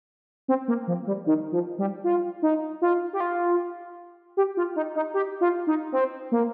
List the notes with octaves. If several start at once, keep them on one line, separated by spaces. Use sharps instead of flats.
C4
A#3
F3
G3
D#3
F3
G3
F4
D#4
F4
G4
F4
G4
F4
D#4
D#4
G4
F4
D#4
C4
A#3